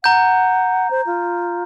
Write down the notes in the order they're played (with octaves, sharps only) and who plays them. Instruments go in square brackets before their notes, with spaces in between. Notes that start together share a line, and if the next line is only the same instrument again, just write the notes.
[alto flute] F#5 [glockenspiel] A#5 G6
[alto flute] C5
F4